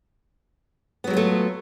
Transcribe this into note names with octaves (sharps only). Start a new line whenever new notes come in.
F#3 G#3 A3 B3 F4